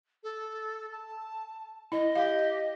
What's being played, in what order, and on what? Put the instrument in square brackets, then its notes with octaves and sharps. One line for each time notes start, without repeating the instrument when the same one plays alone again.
[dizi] A4
A5
[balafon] E4 [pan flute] D#5
[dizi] G4 [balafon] F5